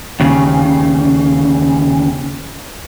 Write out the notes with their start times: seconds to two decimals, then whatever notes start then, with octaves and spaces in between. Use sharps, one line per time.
0.20 D#2 C#3